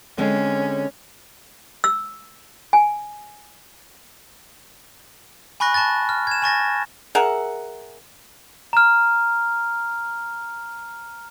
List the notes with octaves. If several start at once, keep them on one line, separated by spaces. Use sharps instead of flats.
D3 G#3 C4 C#4
E6
G#5
G#5 B5 C#6 F#6 A#6
A5 C#6 F#6 A6
F6
G#6 E7
G#5 C#6 A6 A#6
G#4 A#4 E5 F#5
A#5 F6